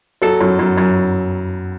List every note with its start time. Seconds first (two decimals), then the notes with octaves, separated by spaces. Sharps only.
0.22 F#3 A4
0.41 F#2
0.59 F#2
0.78 F#2